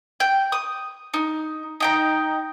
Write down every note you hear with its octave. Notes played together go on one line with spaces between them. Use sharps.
G5
D#6
D#4
D#4 G5 A#5